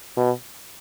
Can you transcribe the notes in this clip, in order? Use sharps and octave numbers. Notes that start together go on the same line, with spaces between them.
B2